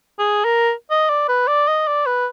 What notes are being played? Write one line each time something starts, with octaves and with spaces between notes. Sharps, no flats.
G#4
A#4
D#5
D5
B4
D5
D#5
D5
B4